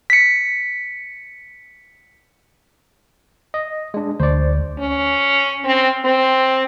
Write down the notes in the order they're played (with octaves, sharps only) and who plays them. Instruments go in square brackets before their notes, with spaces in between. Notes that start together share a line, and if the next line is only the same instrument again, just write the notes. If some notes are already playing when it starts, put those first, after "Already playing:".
[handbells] B6 C#7
[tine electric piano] D#5
G#3 D4
[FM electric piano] D2 [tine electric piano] C5 D5
[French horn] C#4
C4
C4